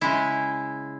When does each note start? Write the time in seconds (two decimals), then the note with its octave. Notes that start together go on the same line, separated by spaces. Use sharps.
0.01 C#3 G#3 E4